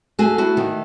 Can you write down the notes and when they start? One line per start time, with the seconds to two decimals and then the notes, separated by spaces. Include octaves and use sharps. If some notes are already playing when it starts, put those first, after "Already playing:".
0.19 A3 F#4 G#4
0.38 E4 F#4
0.57 D#3